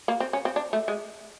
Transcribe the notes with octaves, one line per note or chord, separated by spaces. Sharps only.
A#3
C4
C#4
C4
D4
A3
G#3